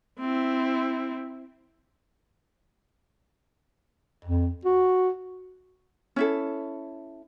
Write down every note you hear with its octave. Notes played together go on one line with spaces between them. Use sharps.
C4 E4
F2
F#4
C#4 E4 A4